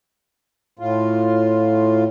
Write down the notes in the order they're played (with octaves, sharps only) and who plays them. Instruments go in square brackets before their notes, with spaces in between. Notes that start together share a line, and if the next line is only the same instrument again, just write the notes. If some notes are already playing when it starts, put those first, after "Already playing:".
[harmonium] A2 F4